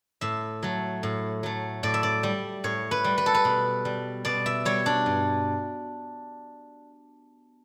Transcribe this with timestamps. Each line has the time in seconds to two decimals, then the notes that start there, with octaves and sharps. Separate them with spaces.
0.21 A2 E5
0.63 F#3 A3
1.03 A2
1.43 F#3 A3
1.83 A2 D5
1.94 E5
2.03 D5
2.23 G3
2.64 A2 C#5
2.91 B4
3.04 G3
3.18 B4
3.26 A4
3.34 B4
3.45 B2
3.85 G3
4.25 B2 D5
4.46 E5
4.65 G3 C#5
4.86 D4
5.06 G2